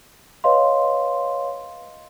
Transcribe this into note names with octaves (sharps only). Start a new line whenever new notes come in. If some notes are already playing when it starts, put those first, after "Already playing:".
B4 C#5 D#5 F5 C6